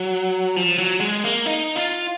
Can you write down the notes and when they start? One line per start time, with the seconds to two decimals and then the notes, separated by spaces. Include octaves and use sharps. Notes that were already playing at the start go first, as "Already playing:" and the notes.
Already playing: F#3
0.56 F3
0.78 F#3
1.00 G#3
1.24 A#3
1.46 D#4
1.76 F4